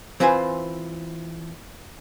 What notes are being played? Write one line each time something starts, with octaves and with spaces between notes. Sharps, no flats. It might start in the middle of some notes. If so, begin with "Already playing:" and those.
E3 C4 F4 B4 C5 G#5